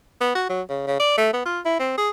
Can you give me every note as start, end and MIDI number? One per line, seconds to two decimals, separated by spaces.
0.21 0.33 59
0.35 0.48 66
0.49 0.62 54
0.69 0.85 49
0.87 0.95 49
1.00 1.17 74
1.17 1.30 57
1.33 1.42 59
1.46 1.60 65
1.65 1.78 64
1.79 1.95 60
1.98 2.10 68